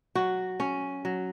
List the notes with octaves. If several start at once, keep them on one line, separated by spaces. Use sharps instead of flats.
F#3 F#4
C#4
F#3